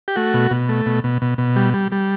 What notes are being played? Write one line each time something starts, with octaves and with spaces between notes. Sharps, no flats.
G4
A3 F#4
B2
B2
A3
B2
B2
B2
B2
G3
G3
G3